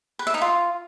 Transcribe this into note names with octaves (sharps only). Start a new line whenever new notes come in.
B4
E5
D#4
F4